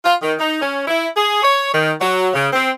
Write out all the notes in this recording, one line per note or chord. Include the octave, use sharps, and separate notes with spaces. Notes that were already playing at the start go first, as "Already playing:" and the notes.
F4
D#3
D#4
C#4
E4
G#4
C#5
D#3
F#3
C#3
C4